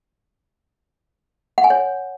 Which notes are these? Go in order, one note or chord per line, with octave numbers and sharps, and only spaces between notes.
F#5
G#5
C#5